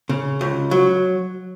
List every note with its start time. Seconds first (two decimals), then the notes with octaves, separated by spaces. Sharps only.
0.09 C#3
0.41 C#2
0.71 F#3